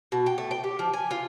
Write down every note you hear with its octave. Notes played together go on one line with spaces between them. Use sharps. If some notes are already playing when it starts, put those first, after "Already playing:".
B2
G5
A3
G5
G4
F3
G#5
F4